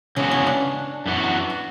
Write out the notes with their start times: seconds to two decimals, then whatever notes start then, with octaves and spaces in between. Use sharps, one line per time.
0.16 C#3 E3 G#3 B3 C#4 F#4
0.31 C#4
0.47 D4
1.06 F#2 E3 B3 F#4
1.50 F#4